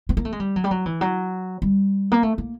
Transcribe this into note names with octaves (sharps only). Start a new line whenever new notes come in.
B3
A#3
A3
G#3
G3
F#3
G3
F#3
E3
F#3
G3
A#3
A3
A#3